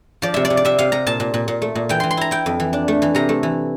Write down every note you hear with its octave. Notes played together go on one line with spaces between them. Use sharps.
F3 D5
C3 E5
D5
C3
D5
C3 E5
C3 F5
C3 A#5
A#2 A5
A#2
A#2
A#2
A3
A#2
E3 G5
E3 C6
C6
E4 A#5
E4 G5
F2
E3
D4
A3
E3
C3 A#5
A3
E3